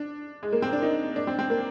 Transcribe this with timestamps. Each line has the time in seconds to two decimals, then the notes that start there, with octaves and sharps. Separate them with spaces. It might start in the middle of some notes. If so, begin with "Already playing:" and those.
Already playing: D4
0.43 G#3
0.53 A#3
0.62 C4
0.73 D4
0.82 D#4
1.16 D4
1.27 C4
1.39 C4
1.50 A#3